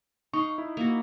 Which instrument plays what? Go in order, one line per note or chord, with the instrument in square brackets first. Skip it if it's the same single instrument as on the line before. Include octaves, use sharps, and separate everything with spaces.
[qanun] D#4 F5 [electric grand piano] C#6
[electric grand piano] E4
[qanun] A#3 F#4